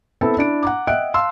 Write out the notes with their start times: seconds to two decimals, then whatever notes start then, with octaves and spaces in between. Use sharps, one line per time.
0.21 B3 C4 E4 A4 A5
0.38 D4 E4 D7
0.63 F#5 A#5 D6
0.87 D#5 E5 F#5 G5 F#6 D7
1.14 F5 A5 C6 E6